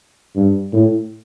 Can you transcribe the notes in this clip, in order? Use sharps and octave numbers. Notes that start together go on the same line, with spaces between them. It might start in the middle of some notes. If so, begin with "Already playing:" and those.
G2
A2